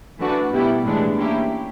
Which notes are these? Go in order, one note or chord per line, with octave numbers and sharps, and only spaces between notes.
E3 A3 D4 F#4 B4
B2 G3 B3 E4 G4
A2 E3 G#3 B3 D4
A#3 C#4 E4 G4